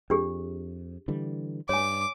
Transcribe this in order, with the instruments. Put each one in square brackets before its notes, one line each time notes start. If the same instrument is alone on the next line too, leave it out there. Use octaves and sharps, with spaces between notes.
[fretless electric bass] F2 [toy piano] D4 G4 G#4
[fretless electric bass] D3 E3 G3
[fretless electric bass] G2 [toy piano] C#5 G#5 [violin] D6